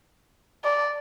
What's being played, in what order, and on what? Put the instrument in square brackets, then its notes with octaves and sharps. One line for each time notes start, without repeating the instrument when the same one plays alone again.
[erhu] D5